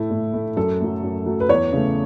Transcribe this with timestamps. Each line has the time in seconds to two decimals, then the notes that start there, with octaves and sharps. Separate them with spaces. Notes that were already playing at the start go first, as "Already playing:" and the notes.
Already playing: A2 A3 E4
0.10 A2
0.34 A3
0.57 F#2 A4
0.81 F#3 A3
1.03 F#2
1.26 F#3 A3
1.40 B4
1.49 E2 C#5
1.73 C#3 A3